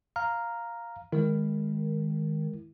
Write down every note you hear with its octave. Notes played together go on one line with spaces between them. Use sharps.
F5 A#5 F6
D#3 G#3 E4